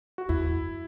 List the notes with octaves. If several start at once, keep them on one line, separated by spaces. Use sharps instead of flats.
F#4
E2 E4
F#2